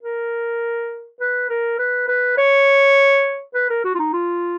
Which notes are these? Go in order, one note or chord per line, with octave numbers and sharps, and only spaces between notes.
A#4
B4
A#4
B4
B4
C#5
B4
A#4
F#4
F4
D#4
F4